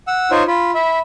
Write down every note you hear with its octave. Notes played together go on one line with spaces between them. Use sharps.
F#5 E6
D#4 F4 C5 C#5
F4 B5
E5 B5